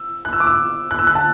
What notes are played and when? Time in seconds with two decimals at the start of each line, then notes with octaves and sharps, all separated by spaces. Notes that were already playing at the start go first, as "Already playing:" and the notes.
Already playing: E6
0.25 F#6
0.33 E6
0.40 D6
0.47 E6
0.91 F#6
0.99 E6
1.07 F#6
1.15 A5